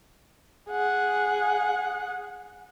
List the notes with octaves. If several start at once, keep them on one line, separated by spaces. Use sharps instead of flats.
G#4 F#5